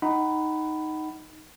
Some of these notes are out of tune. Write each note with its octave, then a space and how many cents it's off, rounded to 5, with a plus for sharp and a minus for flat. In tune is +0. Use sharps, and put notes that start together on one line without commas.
D#4 +0 F#5 +30 B5 +10